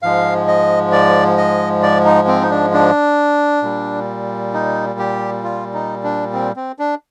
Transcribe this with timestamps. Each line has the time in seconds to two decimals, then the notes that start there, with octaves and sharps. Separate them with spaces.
0.02 G#2 F3 G#3 F5
0.48 D#5
0.92 D5
1.37 D#5
1.83 D5
2.05 D#4
2.28 C4
2.42 D#4
2.51 D4
2.73 D4
3.63 A#2 G3
4.54 D#4
4.99 G4
5.44 F4
5.74 D#4
6.04 D4
6.33 C4
6.56 C4
6.79 D4